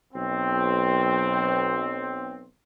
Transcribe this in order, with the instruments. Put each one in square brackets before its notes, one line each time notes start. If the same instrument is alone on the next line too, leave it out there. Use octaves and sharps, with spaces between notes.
[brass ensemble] B1 C4